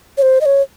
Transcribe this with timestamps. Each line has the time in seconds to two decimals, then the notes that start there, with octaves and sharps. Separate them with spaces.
0.18 C#5
0.22 C5
0.41 D#5
0.46 C#5